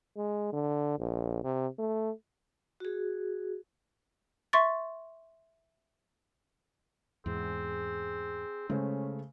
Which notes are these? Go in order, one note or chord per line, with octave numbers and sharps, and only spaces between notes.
G#3
D3
A#1
C3
A3
F#4 G#4
E5 C6 C#6 A6
E2 G#2 C4 G#4
C#3 G#3 A3 C#4 C5